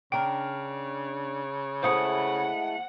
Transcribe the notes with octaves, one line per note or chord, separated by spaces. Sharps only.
C#3 D4 A#4 G5
G#3 A3 E4 C5 F#5 D#6 C#7